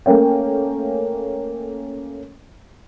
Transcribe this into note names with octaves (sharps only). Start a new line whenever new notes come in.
A3 A#3 C#4 G5